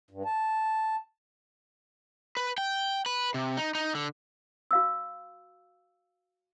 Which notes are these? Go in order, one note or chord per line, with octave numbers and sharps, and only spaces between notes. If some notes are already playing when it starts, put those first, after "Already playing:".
G2
A5
B4
G5
B4
C3
D#4
D#4
D3
F#4 F5 E6